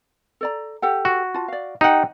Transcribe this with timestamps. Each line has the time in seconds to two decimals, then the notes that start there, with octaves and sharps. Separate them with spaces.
0.41 A4 D5 A#5
0.82 G4 A4 F#5
1.05 F#4
1.34 F4 A5
1.48 D5 F5
1.81 D#4 G4 F#5 G5